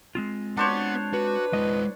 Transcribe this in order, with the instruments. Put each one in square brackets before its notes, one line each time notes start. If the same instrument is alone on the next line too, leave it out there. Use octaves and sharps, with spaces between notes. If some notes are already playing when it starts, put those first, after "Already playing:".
[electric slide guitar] G#3 C4 F4
[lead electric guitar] B3 F#5 [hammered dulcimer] D4 C5 C#5
[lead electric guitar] F#4 [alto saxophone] B4
[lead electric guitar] G#3 E4 [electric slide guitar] D#5